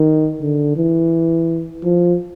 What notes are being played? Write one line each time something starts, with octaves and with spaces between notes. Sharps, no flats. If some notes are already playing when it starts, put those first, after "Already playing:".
Already playing: D#3
D3
E3
F3